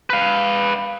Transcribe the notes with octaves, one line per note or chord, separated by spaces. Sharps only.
B4 F5